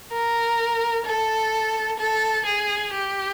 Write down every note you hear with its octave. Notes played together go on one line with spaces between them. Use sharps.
A#4
A4
A4
G#4
G4